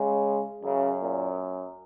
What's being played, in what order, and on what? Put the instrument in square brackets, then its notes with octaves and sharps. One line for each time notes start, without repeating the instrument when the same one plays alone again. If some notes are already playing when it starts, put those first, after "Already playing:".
Already playing: [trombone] C#3 [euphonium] G#3
[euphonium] F#2 [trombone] C#3
[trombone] A#2